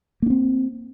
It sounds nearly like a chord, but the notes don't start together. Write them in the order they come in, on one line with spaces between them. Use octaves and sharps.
A#3 D4 C4